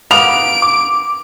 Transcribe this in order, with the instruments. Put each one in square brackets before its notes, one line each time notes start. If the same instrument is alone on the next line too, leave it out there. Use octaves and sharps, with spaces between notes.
[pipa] A#3 B3 [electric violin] D7 [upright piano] F7
[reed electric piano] D6